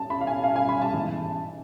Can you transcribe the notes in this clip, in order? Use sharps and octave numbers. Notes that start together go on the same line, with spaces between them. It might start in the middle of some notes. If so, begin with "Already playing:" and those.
Already playing: A5
B5
F5
G#5
F5
G#5
B5
A5
G#2 E3 B3